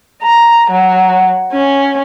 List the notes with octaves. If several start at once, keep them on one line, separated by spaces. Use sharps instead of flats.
A#5
F#3
C#4